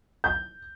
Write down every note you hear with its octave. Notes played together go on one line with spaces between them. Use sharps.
G6